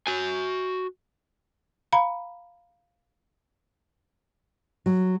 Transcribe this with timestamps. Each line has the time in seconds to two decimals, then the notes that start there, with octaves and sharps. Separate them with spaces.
0.07 F#4 G#5
1.93 F5 A#5 B5
4.86 F#3